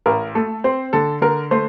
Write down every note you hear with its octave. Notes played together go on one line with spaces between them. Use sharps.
A1 A#4
A3 A4
C4 C5
D3 A4
D3 A#4
A3 C5